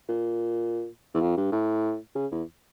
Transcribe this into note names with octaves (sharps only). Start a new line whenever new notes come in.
A#2
E2
F2
G2
A2
C#3
E2